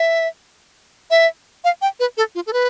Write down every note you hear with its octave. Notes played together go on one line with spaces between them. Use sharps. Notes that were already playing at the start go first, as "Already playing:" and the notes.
Already playing: E5
E5
F5
G5
B4
A4
F4
A4
B4